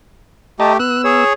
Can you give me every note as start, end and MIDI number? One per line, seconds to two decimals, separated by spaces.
0.60 0.78 57
0.60 0.78 67
0.60 0.73 75
0.60 0.73 81
0.60 0.73 82
0.79 1.24 59
0.79 1.24 88
0.79 1.02 90
1.04 1.33 68
1.04 1.33 73